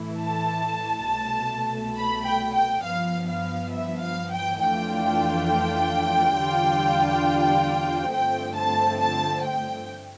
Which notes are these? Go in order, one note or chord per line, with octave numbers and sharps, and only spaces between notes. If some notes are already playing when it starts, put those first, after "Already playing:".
Already playing: A2 E3 A3 E4
A5
C2 B2 A3
B5
G5
G5
G2 F3 B3 F5
F5
E5
F5
G5
F2 E3 A3 D4 F4 G5
E2 D3 G3 D4 F4
G2 D3 F3 A3 C4 G5
A5
A5
G5